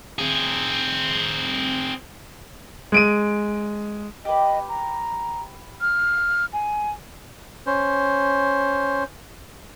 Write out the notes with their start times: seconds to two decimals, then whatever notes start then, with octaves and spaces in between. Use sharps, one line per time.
0.19 C4 G#4
2.92 G#3 D7 D#7
4.25 G4 B4 D#5
4.69 A#5
5.81 F6
6.53 G#5
7.67 C#4 C5